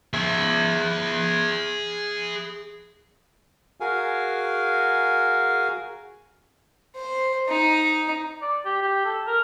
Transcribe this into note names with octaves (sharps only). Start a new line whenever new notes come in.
G#4 E5
F#4 G#4 A#4 F5 G#5
C5
D#4
D5
G4
G4
A4
A#4